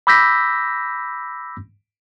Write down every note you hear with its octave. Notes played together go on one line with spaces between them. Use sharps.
B5 D6 E6 G6 A#6 B6